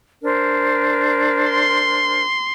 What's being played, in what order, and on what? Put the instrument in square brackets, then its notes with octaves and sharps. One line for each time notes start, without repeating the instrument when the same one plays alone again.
[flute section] D4 A#4 C5
[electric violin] C6